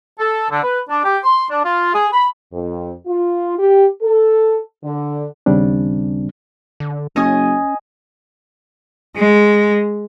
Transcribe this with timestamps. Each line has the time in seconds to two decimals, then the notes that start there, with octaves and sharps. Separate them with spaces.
0.19 A4
0.51 D3
0.63 B4
0.90 D4
1.05 G4
1.24 C6
1.50 D4
1.64 F4
1.95 G#4
2.13 B5
2.52 F2
3.06 F4
3.58 G4
4.02 A4
4.83 D3
5.46 D#2 C#3 G3 C4 D4
6.80 D3
7.16 F#1 C#4 D#5 G#5 D#6
9.17 G#3